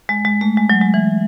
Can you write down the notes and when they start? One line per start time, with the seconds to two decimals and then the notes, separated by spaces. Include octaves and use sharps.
0.09 G#3
0.25 G#3
0.41 A3
0.57 G#3
0.70 F#3
0.82 G#3
0.94 E3